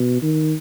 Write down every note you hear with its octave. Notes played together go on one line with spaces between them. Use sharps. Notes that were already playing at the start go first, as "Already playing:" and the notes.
Already playing: B2
D#3